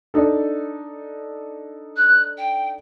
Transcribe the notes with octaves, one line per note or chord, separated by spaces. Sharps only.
D4 D#4 A4
F#6
G5